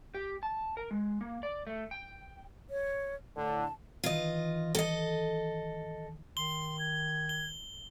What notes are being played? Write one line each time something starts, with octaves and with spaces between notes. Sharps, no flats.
G4
A5
A#4
G#3
A#3
D5
A3
G5
C#5
A2 D3 A5
D#3 E3 F4 D#5
A4 D#5
D#3 C6 G7
G#6
G7